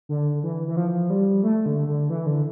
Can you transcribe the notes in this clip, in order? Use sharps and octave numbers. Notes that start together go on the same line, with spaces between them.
D3
E3
E3
F3
G3
A3
D3
D3
E3
D3